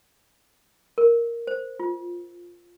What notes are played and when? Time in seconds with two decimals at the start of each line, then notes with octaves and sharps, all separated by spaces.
0.98 A#4
1.47 C5
1.80 F4